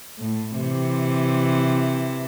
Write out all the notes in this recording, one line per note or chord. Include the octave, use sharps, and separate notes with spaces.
A2
C3 E3